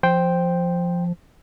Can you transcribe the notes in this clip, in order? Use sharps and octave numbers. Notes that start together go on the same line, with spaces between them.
F3 C5 G5